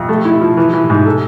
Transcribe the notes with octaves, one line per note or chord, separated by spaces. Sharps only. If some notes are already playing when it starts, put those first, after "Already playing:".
Already playing: F2
A3
E4
F3
E3
E3
G#2
A4